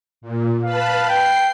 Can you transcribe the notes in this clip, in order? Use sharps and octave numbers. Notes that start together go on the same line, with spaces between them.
A#2
B4 F5 A5 B5
G5 C7